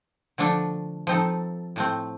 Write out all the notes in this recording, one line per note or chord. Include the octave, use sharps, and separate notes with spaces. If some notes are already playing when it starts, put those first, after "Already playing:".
D3 F3 A3 D4 A4
F3 C4 D#4 A4
A2 A3 C4